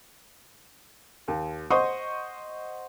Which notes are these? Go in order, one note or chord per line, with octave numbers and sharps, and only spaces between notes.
D#2
C5 D#5 F#5 C6 C#6 D#6